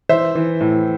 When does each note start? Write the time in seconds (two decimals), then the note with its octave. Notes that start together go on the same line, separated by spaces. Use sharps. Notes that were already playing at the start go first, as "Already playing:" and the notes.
0.09 E3 C5 E5
0.35 E3
0.61 A2